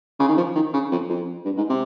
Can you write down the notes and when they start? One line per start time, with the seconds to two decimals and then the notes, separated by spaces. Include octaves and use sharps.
0.19 C#3
0.28 D#3
0.37 F3
0.55 D#3
0.73 C#3
0.91 F2
1.09 F2
1.45 G2
1.57 G#2
1.69 C3